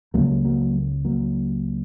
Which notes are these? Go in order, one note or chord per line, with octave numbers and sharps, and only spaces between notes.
C#2 C#3 F#3 A#3
F#3 A#3
F#3 A#3